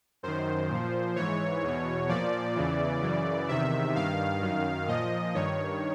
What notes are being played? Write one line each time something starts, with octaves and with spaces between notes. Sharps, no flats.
F#2 D#3 C5
A#2 F3
G#2 E3 C#5
E2 B2
A#2 F3 D5
E2 C#3 E3
F#2 C#3 E3
E2 C3 D#3 E5
G2 D#3 F5
F#2 D#3
A#2 F3 D#5
G2 D#3 C#5